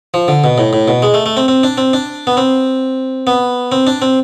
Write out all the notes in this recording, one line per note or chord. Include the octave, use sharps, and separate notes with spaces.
F3
D3
B2
A2
A2
B2
G#3
A3
A3
C4
C4
D4
C4
D4
B3
C4
B3
C4
D4
C4